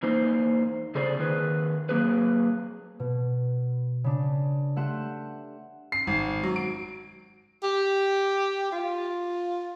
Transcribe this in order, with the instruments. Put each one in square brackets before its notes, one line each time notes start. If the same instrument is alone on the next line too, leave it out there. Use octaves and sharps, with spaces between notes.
[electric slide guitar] E2 A#3 D#4 C5
C#3 G#4 A4 C5 D5
D#3 G#4 B4
F#3 A#3 G#4 B4
[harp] B2
C#3 D4
A3 G4 F#5 C6 E7
[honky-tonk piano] C7
G#1
F#3
D7
[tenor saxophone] G4
F4